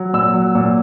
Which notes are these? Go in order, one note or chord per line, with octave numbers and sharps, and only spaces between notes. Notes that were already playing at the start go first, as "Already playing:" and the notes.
Already playing: F#3
A#2 E6
F#3
A#2